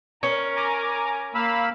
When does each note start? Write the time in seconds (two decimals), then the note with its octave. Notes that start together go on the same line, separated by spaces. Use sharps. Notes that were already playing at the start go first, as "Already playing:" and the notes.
0.23 C#4 A#4
0.56 G#5 A#5 D6
1.35 A#3 F5 B5 E6